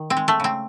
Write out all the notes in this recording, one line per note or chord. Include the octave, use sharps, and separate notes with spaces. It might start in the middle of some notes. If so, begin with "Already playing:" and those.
Already playing: D#3
C4
G#3
A3
C#3 C4